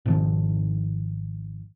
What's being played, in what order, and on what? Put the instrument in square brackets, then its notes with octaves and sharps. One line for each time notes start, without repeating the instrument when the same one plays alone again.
[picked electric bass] G#1 G#2 D#3 F3